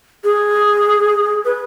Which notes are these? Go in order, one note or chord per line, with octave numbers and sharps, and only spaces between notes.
G#4
B4